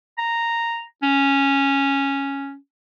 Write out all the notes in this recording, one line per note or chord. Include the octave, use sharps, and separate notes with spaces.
A#5
C#4